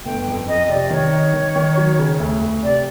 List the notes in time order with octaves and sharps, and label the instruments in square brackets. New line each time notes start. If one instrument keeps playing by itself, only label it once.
[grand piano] G1 [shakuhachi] G5
[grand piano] F2
[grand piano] F2 [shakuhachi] D#5
[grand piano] C3 [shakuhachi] D5
[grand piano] D#3 [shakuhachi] C#5
[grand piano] D#4
D#3
D#3
F#3
C#3
D2
D2
[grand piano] C3 [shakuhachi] D5